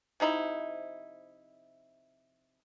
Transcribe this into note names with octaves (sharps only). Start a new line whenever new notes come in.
C3 F3 D#4 E4